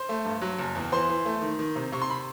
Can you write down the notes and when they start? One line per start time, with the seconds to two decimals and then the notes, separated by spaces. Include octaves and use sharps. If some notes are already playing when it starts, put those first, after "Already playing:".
Already playing: C5 C6
0.09 A3
0.25 G2
0.41 F#3
0.58 F#1
0.75 E2
0.92 E3 C5 C6
1.09 E3
1.25 A3
1.42 D#3
1.59 D#3
1.76 C3
1.92 C3 C#6
2.02 C6
2.10 B5